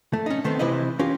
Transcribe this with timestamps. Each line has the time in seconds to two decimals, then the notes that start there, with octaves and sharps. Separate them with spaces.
0.13 A3
0.26 C#4 D#4
0.44 D#3 A3 B3 C4
0.59 C3 E3 E4 B4 C5 D#5
0.99 C#4 F4 G4 A#4